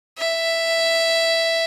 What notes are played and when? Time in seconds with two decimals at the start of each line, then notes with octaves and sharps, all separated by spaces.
0.18 E5